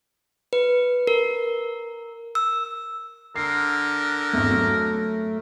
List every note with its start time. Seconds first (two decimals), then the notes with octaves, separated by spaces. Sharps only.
0.53 B4
1.07 A#4
2.35 E6
3.36 D3 A#4 C7
4.33 G#1 E2 A3
4.49 F#3